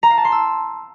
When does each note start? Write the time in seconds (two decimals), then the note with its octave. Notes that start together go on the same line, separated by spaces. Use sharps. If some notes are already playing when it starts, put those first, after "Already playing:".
0.03 A#5
0.10 F5
0.17 A5
0.25 C6
0.32 E6